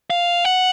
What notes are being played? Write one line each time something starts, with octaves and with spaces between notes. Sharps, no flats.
F5
F#5